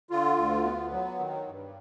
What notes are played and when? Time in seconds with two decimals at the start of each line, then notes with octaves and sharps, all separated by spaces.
0.10 D3 F4
0.38 D2
0.65 B3
0.92 F#3
1.19 D#3
1.47 G2